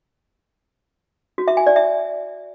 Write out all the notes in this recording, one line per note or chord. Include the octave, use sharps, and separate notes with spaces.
F#4
E5
G#5
D5
E5